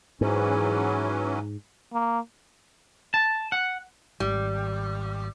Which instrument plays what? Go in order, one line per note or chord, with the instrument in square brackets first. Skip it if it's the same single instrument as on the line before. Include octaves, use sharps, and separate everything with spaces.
[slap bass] G#2 [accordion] E3 F#3 C#4
[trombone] A#3
[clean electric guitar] A5
F#5
[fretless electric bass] G#1 [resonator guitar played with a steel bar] G3